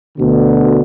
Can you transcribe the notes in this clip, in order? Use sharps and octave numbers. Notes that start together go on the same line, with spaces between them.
D2 B2 D3